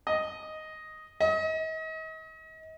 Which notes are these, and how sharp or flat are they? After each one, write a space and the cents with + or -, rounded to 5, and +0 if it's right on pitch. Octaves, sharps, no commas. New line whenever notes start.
D#5 +5
D#5 +40